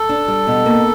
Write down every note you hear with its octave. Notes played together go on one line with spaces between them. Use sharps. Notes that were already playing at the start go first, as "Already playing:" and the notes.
Already playing: A4
D4
G3
B2
A#3